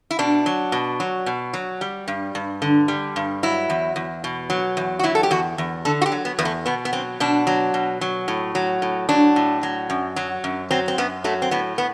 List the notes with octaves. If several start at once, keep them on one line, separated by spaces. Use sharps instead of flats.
E4
B2 D4
F#3
B2
F#3
B2
F#3
G3
G2
G2
D3
G3
G2
F#3 E4
E2
E2
B2
F#3
E2
F#4
F#3 E4
A4
G4
E2 F#4
E2
D3 A4
F#4
G4
F#3
B3
E2 B3
A3
B2 B3
B3
F#3 C4
B2 D4
F#3
B2
F#3
A2
F#3
A2
F#3 D4
A2
F#3
F#2
F#3
F#2
F#3 C4
C4
F#2 B3
F#3 A3
C4
A2 B3
B3